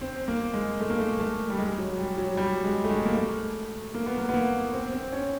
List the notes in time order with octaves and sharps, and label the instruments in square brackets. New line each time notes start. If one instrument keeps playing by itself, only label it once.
[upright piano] C4
A#3
G#3
A3
A#3
A3
A3
G3
G#3
F#3
G3
F#3
G3
G#3
A3
G#3
A#3
A3
A#3
B3
A#3
B3
A#3
C4
C4
C#4